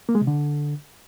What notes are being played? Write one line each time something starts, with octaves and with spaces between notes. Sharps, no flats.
A#3
G#3
C3
D3